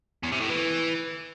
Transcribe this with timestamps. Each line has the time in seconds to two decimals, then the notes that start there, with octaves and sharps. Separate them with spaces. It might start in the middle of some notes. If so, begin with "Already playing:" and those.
0.23 E2
0.32 C3
0.41 A2
0.49 E3